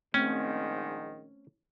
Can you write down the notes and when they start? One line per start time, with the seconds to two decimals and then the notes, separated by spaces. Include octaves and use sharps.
0.14 A#1 G#2 D#3 A3 C4 C#4 G5